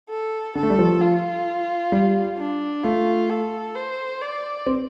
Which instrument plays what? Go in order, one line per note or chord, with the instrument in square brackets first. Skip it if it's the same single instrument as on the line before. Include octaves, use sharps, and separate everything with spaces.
[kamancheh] A4
[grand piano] D3 [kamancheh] A4
[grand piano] A3
G3
F3
[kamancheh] F4
[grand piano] G3
[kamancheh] D4
[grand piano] A3 [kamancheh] F4
[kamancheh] A4
C5
D5
[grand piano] C4